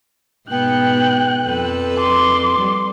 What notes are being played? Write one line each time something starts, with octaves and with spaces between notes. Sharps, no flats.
G#2 B2 B3 G5 F#6
F2 A4 B4
C6 D6
G3